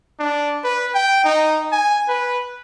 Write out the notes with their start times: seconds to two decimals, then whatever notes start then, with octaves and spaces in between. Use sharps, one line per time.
0.19 D4
0.64 B4
0.95 G5
1.24 D#4
1.72 G#5
2.08 B4